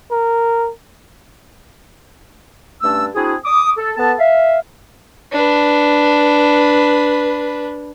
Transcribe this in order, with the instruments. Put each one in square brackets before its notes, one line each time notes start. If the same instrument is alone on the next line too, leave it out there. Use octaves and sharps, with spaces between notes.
[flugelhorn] A#4
[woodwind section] G2 A3 C#4 D4 A5 E6
C4 D4 E4 F#4 G#4
D6 D#6
A4
B3 A4 A5
E5 F5
[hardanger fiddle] D4 B4